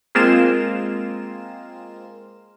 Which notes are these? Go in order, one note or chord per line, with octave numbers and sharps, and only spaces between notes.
G#3 A#3 C4 F4 A#4 E7